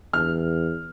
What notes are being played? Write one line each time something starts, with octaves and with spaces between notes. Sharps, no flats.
E2 F6